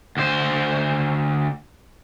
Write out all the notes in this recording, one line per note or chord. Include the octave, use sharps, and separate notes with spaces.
D2 C5